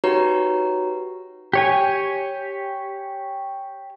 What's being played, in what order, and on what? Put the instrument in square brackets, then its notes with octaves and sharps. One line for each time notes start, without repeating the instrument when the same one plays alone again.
[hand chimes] D#4 F#4 G4 B4 C#5 A#5
[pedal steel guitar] G4 C#5 G#5